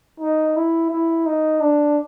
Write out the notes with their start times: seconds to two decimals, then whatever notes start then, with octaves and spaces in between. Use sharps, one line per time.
0.20 D#4
0.56 E4
0.91 E4
1.26 D#4
1.61 D4